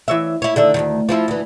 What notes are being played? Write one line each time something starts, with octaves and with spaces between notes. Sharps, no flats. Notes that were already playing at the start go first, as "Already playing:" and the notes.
E3 C#5 E5
E4 C#5
D3 D#3 E5
D2 G2 D#3
F3 C4 E4
D2 E3